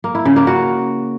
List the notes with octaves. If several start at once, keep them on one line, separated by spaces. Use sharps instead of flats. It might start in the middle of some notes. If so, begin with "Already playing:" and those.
A#3
E4
C#3
A#3
F#4